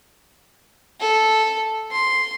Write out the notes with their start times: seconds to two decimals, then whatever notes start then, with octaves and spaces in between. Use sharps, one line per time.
1.00 A4
1.91 C6